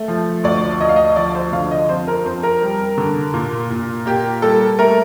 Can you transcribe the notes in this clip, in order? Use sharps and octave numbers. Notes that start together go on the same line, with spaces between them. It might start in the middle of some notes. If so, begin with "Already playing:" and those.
Already playing: A3
F3
D2 D5
D2 D#5
F5
D#5
F3 D5
C5
D3 F5
D#5
F2 C5
A#4
F2 C5
A#4
G3
D3
A#2
A#2
A#3 G4
G3 A4
A3 A#4